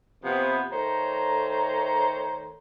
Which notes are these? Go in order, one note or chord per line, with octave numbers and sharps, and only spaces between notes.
C3 F3 B3
D#3 A3 C5 C#5 A#5